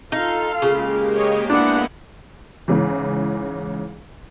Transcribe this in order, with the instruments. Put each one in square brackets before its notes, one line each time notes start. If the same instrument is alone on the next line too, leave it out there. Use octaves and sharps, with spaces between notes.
[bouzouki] D#4 [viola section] F4 A4 F5
[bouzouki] C#3 [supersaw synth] G#3 A#3 G4
[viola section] C#5 D#5
[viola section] B3 E4 F#5 [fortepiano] D4
[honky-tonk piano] G#2 C#3 E3